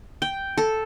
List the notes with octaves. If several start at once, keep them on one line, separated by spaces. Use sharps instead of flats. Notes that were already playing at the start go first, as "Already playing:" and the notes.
G5
A4